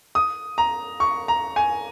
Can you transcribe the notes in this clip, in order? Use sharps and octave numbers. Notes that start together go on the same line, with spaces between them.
D#6
A#5
C#6
A#5
G#5